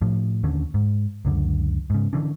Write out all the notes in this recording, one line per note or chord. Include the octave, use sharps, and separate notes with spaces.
A2 F3
D#2 D3 C#4
G#2
C#2 F#2 D3
G#2 C#3
D3 E3 C#4 D4